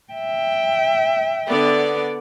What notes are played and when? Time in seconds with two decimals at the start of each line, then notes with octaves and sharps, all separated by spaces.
0.13 E5 G5
1.49 D3 B3 D5